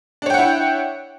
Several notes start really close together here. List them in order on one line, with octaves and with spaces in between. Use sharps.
D4 C#5 G5 F#5 E4